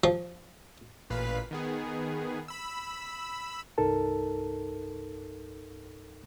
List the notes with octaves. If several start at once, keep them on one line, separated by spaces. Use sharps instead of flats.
F3
A1 A#2 B4 F5 B6
D#3 B3 G#4
B5 E6
C2 G2 D#4 A4 A#4 A5